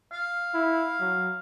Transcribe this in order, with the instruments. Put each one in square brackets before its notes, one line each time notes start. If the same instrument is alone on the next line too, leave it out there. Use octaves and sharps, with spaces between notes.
[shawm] F5
[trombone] E4
F#3